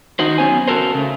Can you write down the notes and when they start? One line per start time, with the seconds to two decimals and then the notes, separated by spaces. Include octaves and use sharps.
0.19 D#3 D#4 F#4 C5
0.38 F#3 B3 C#4 C5 G#5
0.68 C#3 G#3 F#4 A4 A#4 C5
0.95 C#3 A3